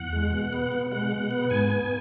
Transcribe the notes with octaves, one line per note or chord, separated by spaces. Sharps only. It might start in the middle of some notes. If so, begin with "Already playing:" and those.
Already playing: E2 F#5
G#3
B2
B3
B2
G#3 F#5
B2
B3
G#2 G#5
B3